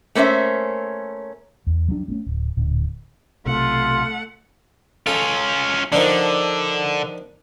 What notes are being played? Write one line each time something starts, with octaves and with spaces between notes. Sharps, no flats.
A3 A#3 C#4 C5 E5
E2
F#3 A3 D4
A3 C4 C#4
D1
D1 A#2 D3
B1 C3 A3 F4 F#5
C#4 F4 A4
D3 D#3 F3 D4